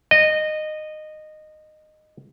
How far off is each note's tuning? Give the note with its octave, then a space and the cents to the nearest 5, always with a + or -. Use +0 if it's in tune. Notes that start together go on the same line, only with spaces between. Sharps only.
D#5 -15